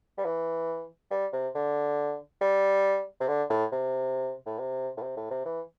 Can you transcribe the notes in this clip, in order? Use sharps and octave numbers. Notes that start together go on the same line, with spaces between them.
G3
E3
G3
C3
D3
G3
C3
D3
A2
C3
A2
C3
A2
C3
A2
C3
E3